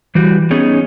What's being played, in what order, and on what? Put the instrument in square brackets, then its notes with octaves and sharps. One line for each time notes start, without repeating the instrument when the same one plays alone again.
[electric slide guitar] E3 G3 F#4
B3 C#4 D#4 G#4